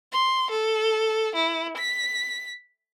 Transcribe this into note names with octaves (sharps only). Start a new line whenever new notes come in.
C6
A4
E4
B6